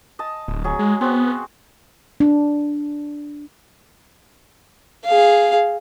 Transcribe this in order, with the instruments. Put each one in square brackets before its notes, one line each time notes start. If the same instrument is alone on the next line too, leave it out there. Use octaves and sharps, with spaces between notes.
[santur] D#5 A5
[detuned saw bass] D1
[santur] F#3 G#4
[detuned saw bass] G#3
[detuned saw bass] B3 [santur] C4 F#4
[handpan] D4
[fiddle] G#4 F5